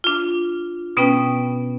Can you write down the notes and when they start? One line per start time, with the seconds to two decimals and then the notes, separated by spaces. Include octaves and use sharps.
0.04 D4 F4
0.97 B2 B3 C#4 B4 G5